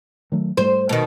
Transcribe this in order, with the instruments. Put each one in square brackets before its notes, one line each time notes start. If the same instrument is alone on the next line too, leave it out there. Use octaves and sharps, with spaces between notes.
[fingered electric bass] D#3 F#3 A3
[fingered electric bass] G#2 G3 A3 [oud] C5
[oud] B2 D#3